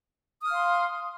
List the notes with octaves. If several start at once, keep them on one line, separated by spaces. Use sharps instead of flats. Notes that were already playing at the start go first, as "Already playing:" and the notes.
F5 C6 D#6 F6